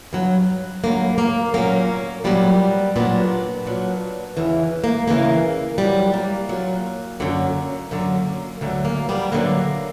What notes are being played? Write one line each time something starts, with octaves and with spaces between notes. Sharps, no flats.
G2 F#3
G2 F#3 A#3
A#3
A#2 F#3 A#3 C#4
A#2 F#3 G3 B3
A#2 F#3 B3 D4
A#2 F#3
E2 C#3 E3
A#3
E2 C#3 E3 A#3
A#2 F#3 G3
A#3
A#2 F#3
F#2 D3 F#3
F#2 D3 F#3 A#3
D2 D3 F#3
A#3
G3 B3
D2 D3 F#3 A#3